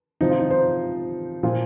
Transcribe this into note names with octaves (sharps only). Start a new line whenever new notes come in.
C3 F3 D#4
F4
D#4
C5
A#2 F3 F4